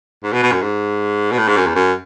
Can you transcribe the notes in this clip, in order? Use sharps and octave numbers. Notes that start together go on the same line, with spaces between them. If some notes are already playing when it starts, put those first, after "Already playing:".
G#2
B2
B2
F#2
G#2
B2
A2
G#2
F#2
E2
F#2